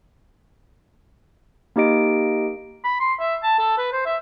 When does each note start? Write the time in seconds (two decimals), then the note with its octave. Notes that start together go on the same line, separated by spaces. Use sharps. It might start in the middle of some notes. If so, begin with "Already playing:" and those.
1.76 A#3 D#4 G4 D#5 D7
2.84 B5
3.00 C6
3.20 E5
3.43 A5
3.59 A4
3.78 B4
3.92 C5
4.06 E5